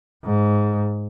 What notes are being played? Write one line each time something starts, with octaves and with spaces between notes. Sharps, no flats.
G#2